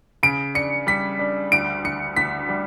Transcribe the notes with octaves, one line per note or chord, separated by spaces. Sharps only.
C#3 D7
D4 C#7
G3 B6
D4
D2 D7
D2 C#7
D2 B6
G3